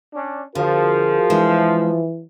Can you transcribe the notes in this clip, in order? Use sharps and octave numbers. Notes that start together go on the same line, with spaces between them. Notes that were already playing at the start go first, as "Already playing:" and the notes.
C#4 D4
D3 F3 F#4 G#4 A#4
E3 G#3 D4 E5